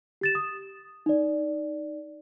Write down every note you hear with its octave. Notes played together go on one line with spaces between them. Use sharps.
G4 A6 E7
D#6
D#4 D5